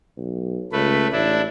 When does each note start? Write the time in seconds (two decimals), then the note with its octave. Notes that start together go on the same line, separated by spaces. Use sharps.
0.17 B1
0.72 C#2 A3 B4
1.12 A1 D4 E4